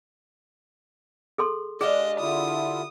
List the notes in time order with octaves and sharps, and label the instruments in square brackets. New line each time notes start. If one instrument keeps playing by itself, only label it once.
[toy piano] G#4 A4 C6
[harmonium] G#3 [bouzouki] D4 G4 F5 [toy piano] G#4 [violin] D#5
[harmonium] D3 E4 F4 [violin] D#6